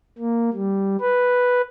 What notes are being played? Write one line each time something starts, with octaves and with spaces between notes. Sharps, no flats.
A#3
G3
B4